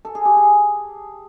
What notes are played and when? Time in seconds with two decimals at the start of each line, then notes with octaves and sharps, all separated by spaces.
0.05 A4
0.15 G#4
0.25 G4
0.37 G#4